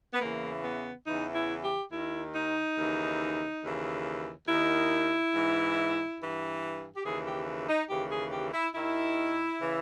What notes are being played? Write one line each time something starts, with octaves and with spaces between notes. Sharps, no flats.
B3
E2 C#3 E3 A#3
B3
E2 C#3 E3 D#4
E4
G4
D#2 D#3 E4
D#4
D#2 C#3 E3
D#2 C#3 E3
D#2 D#3 E4
G#2 E3
G2 E3
G4
D#2 C#3 E3 G#4
G4
D#4
D#2 C#3 E3 G4
G#4
G4
E4
D#2 D#3 E4
C#3 E3